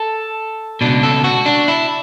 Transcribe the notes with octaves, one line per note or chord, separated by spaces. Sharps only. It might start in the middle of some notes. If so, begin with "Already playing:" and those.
Already playing: A4
C#2 B2 D4
A4
F#4
D4
E4